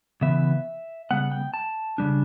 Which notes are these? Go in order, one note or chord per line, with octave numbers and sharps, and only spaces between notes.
C#3 E3 B3 E5
C#3 G3 B3 F#5
G5
A5
C#3 G3 D4